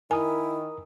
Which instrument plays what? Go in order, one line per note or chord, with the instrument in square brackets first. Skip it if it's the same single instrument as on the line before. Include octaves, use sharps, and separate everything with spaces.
[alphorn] D#3 [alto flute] E4 [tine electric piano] A#4 D#6 [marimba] G#5